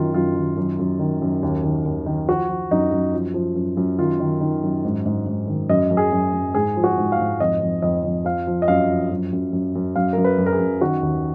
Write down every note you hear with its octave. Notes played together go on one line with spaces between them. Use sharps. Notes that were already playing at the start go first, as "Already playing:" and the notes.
Already playing: F#2 D#3 F4
F#2 F4
D#3
F#2
F#2
D#3
F#2
D#2
D#3
D#2
D#3
F3 F#4
F3
F#2 D#4
F#2
F3
F3
F#2
F#2
D#3 F4
D#3
D#3
F#2
G#2
G#2
G#2
D#3
F#2 D#5
F#2
G#4
F#2
F#2
G#2 G#4
F3
F#4
G#2
F5
G#2
F2 D#5
F2
F2 D#5
F2
F3 F5
F3
D#5
F#2 F5
F3
F#2
F#2
F#2
F#2
F#2 F5
F#2 A#4
B4
F#2
A#4
G#4
F#2
D#3 F#4
D#2